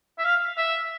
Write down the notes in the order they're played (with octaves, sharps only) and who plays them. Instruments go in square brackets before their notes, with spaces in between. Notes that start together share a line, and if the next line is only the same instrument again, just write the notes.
[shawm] E5
F5
E5